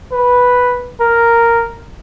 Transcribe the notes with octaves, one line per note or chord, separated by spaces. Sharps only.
B4
A#4